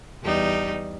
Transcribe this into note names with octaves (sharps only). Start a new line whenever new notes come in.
E2 G3 D#4